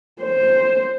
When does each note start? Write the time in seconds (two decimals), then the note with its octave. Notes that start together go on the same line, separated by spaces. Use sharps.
0.21 C5